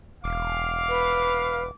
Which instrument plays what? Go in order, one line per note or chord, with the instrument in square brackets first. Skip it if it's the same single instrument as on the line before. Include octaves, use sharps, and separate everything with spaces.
[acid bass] E1 [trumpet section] F5 [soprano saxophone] D6
[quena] B4